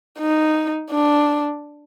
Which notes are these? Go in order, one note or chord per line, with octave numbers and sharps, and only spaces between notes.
D#4
D4